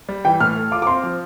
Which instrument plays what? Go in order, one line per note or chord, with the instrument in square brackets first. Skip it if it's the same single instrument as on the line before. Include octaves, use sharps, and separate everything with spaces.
[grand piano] G3
[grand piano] E3 [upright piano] G5
[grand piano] A2 [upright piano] F6
[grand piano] A4
[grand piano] F4 [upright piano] D6
[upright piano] D6
[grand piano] C4 [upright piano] C6
[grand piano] F3